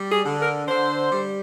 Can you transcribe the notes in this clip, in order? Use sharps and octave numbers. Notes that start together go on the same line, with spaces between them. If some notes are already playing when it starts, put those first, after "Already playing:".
Already playing: G3
G#4
D3
A#4
D3 C5
G3